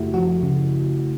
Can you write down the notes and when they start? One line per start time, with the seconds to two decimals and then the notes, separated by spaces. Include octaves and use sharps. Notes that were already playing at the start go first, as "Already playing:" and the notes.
Already playing: F#2 C#3 A3 E4 F#4 G4
0.14 F3 F#4
0.43 C#3